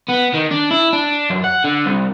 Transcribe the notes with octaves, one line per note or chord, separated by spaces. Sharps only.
B3
D#3
D4
E4
D4
F#2
F#5
D3
C2